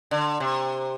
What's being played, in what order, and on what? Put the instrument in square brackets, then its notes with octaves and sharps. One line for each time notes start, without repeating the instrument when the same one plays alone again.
[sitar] D3
C3